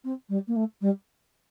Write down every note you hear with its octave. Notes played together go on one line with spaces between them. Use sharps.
C4
G3
A#3
A3
G3